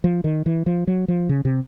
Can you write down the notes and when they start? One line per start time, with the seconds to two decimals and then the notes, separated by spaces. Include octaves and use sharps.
0.04 F3
0.24 D#3
0.46 E3
0.66 F3
0.87 F#3
1.08 F3
1.29 C#3
1.45 C3